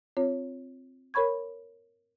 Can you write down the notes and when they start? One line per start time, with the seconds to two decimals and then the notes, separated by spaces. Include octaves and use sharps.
0.17 C4 F4 C#5
1.14 A#4 C#5 B5 C#6 G#6